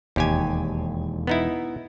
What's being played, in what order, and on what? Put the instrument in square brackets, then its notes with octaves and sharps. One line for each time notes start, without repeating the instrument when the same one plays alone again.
[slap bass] E1 [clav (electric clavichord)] D#2 G4 G#5
[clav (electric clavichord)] B3 D#4 E4